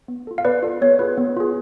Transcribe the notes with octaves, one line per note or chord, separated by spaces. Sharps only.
B3
F4 A4
F5
B3 B4 D5
F4 A4
B3 C#5
F4 G#4 B4
B3
F4 G#4